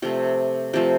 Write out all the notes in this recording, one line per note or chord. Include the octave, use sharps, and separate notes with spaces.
C3 F3 A3 G4
C3 F3 A3 G4